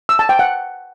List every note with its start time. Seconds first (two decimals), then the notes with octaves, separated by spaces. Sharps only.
0.09 E6
0.19 A5
0.29 G5
0.39 F#5